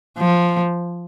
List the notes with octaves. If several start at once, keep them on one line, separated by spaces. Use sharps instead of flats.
F3